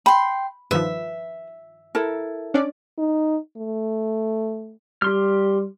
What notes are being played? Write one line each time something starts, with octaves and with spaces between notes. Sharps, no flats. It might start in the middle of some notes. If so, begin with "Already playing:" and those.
G5 B5 C6
G2 D#3 F3 B4 E5
E4 A4 A#4
C#4 D4 D5
D#4
A3
G3 G4 C6 F6